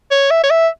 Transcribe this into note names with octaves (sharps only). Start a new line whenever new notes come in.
C#5
E5
C#5
E5